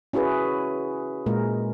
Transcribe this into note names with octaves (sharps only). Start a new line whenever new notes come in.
C#4 E4 F#4 G#4 B4
A#2 G#3 A#4